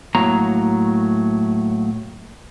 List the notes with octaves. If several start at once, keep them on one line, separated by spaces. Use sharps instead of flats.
A2 F#3 A#3 A#5